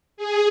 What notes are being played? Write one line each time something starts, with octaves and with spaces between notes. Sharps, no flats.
G#4